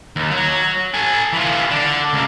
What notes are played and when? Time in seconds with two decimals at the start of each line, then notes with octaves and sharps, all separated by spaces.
0.16 D#2
0.31 F#3
0.94 A4 G#5
1.33 E3 F4
1.71 D3 D4
2.13 C#2 A#3